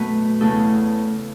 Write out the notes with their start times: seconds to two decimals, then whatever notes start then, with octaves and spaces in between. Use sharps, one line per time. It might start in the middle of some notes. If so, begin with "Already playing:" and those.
Already playing: F#2 B2 F#3 A3 B4
0.41 E2 C#3 A3 A4